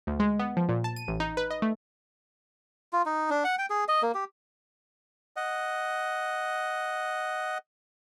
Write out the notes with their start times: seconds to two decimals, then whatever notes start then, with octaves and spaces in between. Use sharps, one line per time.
0.07 D2
0.20 G#3
0.40 B3
0.57 F3
0.69 A#2
0.84 A5
0.96 D#7
1.08 A1
1.20 D#4
1.37 B4
1.51 D#5
1.62 A3
2.93 F4
3.06 D#4
3.30 D4
3.44 F#5
3.58 G5
3.70 G#4
3.88 D#5
4.02 A#3
4.14 G4
5.36 D#5 F#5